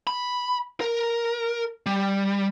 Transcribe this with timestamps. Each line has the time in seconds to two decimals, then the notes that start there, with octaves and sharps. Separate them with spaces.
0.07 B5
0.81 A#4
1.86 G3